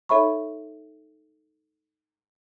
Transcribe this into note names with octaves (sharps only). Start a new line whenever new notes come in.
D#4 A4 C#5 E5 B5 C#6